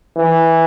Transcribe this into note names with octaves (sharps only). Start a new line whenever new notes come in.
E3